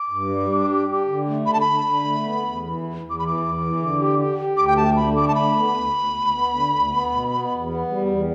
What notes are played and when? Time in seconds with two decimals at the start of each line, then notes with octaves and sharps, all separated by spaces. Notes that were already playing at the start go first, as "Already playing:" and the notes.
Already playing: D6
0.10 G2
0.29 G3
0.49 D4
0.68 G4
0.88 G4
1.07 D3
1.26 A3
1.46 D3 B5
1.53 A5
1.61 B5
1.66 D3
1.85 D3
2.04 A3
2.24 B3
2.44 E2
2.63 E3
2.83 E2
3.02 E2
3.10 D6
3.19 E3 B5
3.27 D6
3.40 E2
3.60 E3
3.80 D3
3.99 G4
4.19 G4
4.38 G4
4.57 D2 D6
4.68 G5
4.77 A3 A5
4.96 D3 B5
5.16 A3 D6
5.28 A5
5.35 D3 B5
5.55 B3
5.74 D2
5.93 D2
6.13 D2
6.33 B3
6.52 D3
6.72 D2
6.90 B3
7.10 B2
7.30 B3
7.49 E2
7.68 B3
7.88 G3
8.07 E2